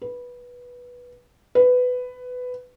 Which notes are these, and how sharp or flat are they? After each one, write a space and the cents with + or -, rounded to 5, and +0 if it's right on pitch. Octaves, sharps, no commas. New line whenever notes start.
B4 -10
B4 +15